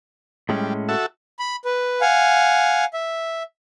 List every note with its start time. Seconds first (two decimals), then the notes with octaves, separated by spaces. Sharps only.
0.49 A2 G3 G#3 C#4
0.89 F#4 A4 E5
1.39 B5
1.65 B4
2.01 F5 F#5 G#5
2.93 E5